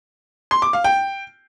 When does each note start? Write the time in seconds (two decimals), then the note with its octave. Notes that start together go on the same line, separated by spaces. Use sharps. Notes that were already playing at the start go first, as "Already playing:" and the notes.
0.51 C6
0.62 D6
0.73 F5
0.84 G5